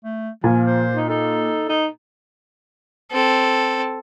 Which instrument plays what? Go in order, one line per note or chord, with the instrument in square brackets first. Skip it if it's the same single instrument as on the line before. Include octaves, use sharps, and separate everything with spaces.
[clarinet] A3
[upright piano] A#2 [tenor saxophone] F3 [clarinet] G#5
[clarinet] C5
[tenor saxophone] D#4
[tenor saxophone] D#4 [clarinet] A4
[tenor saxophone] D#4
[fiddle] C4 A4